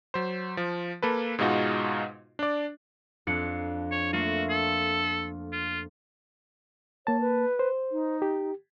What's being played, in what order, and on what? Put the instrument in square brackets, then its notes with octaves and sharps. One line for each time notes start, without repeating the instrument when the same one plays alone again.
[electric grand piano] F#3 C5
F3
A#3 A4 B4
G#2 B2 G#3 D#4 F4 F#4
D4 D5
[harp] F2 D4 C#7
[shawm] C#5
[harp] A3 A#3 F4 [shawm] F#4
[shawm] A4
F4
[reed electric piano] A#3 A5 [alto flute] C#5
[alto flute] B4
[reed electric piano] C5
[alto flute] D#4
[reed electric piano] G4